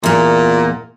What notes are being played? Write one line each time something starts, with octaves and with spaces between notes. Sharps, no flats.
E2 A#2 A#3